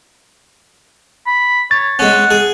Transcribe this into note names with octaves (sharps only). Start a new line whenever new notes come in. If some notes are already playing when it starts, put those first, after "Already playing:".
B5
C#5 A6
G#3 C#4 F#5
G#4